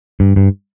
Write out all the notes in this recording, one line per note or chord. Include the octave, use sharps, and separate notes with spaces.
G2
G2